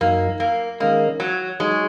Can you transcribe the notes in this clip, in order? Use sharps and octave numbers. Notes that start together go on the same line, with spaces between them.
F#2 F#3 A#3 D#4
A#3
D#3 G#3 A#3 C#4 A#4 D#5
F#3
F#3 G#3 D#4 G#4 C#5